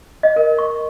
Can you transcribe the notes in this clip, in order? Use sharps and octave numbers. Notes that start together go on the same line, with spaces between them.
D#5
A#4
C#6